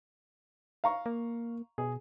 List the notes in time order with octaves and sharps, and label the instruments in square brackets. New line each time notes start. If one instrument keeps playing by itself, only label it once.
[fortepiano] F5 A#5 C#6
[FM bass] A#3
[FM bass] B2 [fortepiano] G#4